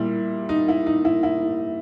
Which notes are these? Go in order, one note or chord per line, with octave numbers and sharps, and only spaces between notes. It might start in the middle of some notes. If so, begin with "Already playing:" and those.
Already playing: A#2 G3 E4
D#4
E4
D#4
E4
E4